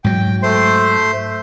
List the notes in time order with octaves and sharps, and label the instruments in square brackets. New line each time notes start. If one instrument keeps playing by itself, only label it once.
[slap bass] G#2 F#3 [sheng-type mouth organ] G5
[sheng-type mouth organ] A3 C5 C6